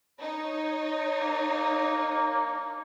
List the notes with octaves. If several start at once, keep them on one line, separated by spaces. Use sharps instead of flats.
D#4 C#5
A#3